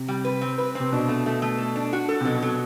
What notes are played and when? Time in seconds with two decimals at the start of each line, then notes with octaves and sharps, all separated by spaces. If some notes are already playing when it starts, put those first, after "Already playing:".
Already playing: C3
0.08 G3
0.25 B4
0.41 C4
0.58 B4
0.75 C3 C4
0.92 B2 D4
1.08 A3
1.26 A3
1.42 A3
1.58 A4
1.76 D4
1.93 F#4
2.08 A4
2.21 C3
2.25 B2 F#3
2.42 F#3